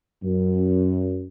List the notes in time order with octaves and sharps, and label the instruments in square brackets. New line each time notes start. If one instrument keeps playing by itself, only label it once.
[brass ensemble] F#2